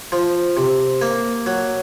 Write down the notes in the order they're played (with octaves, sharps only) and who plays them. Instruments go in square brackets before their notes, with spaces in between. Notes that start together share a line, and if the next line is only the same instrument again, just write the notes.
[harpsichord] F3
C3
A#3
F#3